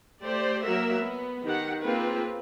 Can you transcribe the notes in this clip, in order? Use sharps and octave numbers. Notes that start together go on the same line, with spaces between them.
A3 G4 C5 D5
F#3 A#3 F#4 A#4 E5
B3
D#3 G4 F#5
A#3 C4 F4 G#4 B4